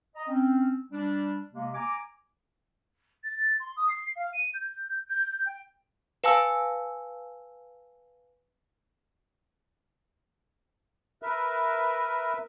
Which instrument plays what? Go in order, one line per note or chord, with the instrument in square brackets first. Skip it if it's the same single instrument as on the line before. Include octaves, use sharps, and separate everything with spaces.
[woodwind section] D#5 A#5
C4 C#4
G3 D4
C3 G#3 A#3
G#5 A#5 D6
[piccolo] A6
C6
D#6
C7
F5
D#7
G6
G6
G5
[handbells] B4 F5 G#5 A5 E6
[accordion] A#4 B4 E5